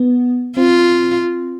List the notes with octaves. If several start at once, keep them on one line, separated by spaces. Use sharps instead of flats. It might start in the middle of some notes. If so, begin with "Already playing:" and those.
Already playing: B3
C4 F4